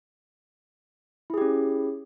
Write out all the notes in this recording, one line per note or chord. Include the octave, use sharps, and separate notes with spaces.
C#4 E4 G4 G#4